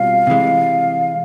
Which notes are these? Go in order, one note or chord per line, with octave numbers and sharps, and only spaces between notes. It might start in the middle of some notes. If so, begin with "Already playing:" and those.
Already playing: B2 G3 C4 F4 F5
C3 E3 G#3